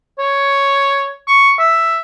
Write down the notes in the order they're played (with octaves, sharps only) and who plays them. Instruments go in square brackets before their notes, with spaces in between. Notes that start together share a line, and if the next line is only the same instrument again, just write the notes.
[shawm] C#5
C#6
E5